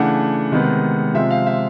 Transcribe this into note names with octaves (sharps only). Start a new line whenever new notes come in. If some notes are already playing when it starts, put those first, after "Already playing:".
Already playing: C#3 E3 A3 D4 F#5
C3 D#3 G#3 B3
C3 F3 G#3 C4 E5
F5
E5